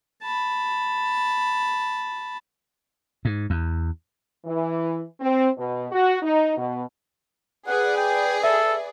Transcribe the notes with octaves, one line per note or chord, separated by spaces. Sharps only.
A5 B5
G#2
E2
E3
C4
B2
F#4
D#4
B2
G#4 B4 D5 F#5
G5
A4 E5